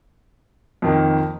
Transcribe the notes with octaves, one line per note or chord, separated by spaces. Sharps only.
F2 D#3 A#3